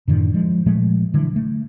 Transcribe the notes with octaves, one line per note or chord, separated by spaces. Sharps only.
F#2 A2 D3 D#3
F3 G#3
A#2 F3 G#3 A3
D3 E3 F#3
A3